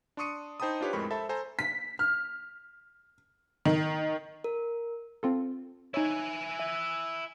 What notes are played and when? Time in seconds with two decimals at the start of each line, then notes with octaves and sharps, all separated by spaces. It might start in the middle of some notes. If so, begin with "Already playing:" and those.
0.17 D4 C6 C#6 D#6 C#7 D#7
0.60 D#4 C5 G5 A5 B5 D#6
0.81 D4 F4 G4 B4 C#5
0.93 F2 A2 G#3 A#4 B5 C#6
1.10 A4 C5 E5 A5 B5
1.29 A4 C5 G#5 A#5
1.59 B6
1.99 F6
3.65 D#3
4.44 A#4
5.23 C4 F4 A4
5.94 D#4 E4 C#5 G#5
6.60 E5